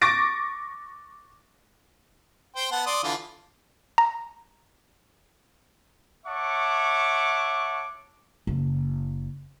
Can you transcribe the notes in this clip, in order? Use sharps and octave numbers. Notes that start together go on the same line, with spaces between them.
C#6 D6 A6 A#6 D7
C5 G5 C6
B3 F#5 A5
D5 C6 D#6
D3 E3 F4
A#5
C#5 E5 F#5 A5 C#6 D6
F#1